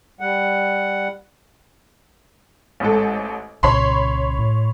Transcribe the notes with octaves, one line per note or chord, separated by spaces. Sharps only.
G3 F#5
A1 G#2 A4
C2 A#2 C#3 C#5 B5 C6
A2